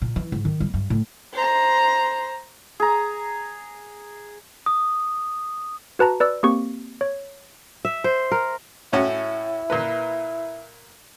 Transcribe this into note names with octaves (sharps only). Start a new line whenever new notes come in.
A#2
E3
G#2
D#3
G3
G2
A2
C5 A#5
G#4 A#5
D#6
F#4 B4 A5 A#5
B4 D5 E6
A#3 C4 G4 C#6
C#5
E5
C5
A#4
A2 C#4 E4 F#4
A#2 A#3 B4